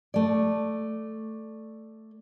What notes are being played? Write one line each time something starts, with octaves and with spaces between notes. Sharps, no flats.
A3 D5